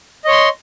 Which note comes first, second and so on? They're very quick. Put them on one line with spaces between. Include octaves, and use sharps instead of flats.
D#5 C#5 C6